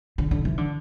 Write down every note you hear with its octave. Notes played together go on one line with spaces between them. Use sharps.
D3
D3
E3
D3